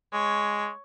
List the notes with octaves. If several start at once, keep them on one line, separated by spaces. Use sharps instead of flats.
G#3 C#5